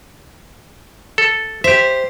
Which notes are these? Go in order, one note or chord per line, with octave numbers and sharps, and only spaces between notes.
A4
G4 C5 E5